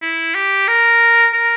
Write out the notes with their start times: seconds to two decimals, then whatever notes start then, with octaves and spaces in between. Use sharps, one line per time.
0.02 E4
0.35 G4
0.68 A#4
1.34 A#4